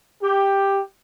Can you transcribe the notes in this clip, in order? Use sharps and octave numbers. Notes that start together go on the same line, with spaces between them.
G4